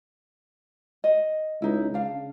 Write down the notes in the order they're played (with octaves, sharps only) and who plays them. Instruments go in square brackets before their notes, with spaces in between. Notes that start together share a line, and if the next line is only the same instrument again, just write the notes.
[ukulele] D#5
[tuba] C#2 [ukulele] D#4 E4
[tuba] C#3 [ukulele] D4 F5